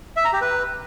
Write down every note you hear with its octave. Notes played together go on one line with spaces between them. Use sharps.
E5
A#5
G4
B4